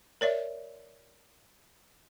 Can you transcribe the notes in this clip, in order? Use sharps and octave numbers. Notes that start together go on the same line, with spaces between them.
A#4 C#5 D5 E5